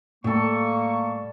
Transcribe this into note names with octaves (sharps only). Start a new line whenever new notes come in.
A2 G3 A#3 A4 C#6